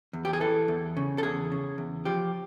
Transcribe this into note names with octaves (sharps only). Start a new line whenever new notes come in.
E2
G4
G#4
E3 A4
E2
C#3
A4
E2 G#4
C#3
E2
F3 G4